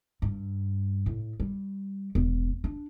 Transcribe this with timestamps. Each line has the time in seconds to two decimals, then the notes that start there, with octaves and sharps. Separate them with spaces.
0.22 G2
1.06 A2
1.40 G3
2.15 E1
2.64 D4